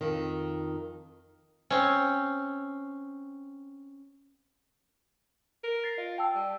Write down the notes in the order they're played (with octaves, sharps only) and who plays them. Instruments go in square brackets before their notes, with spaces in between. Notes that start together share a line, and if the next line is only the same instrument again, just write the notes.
[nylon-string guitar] F2 D#3
[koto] C4 C#4
[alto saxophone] A#4
[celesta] A6 A#6 C7
[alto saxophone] F4 [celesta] D#5
[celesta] G5 A5 E6
[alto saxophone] G3